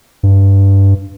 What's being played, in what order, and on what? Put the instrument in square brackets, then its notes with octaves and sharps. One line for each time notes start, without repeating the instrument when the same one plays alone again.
[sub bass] G2